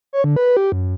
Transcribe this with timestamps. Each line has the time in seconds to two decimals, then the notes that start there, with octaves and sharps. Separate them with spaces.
0.13 C#5
0.24 D3
0.36 B4
0.57 G4
0.72 F#2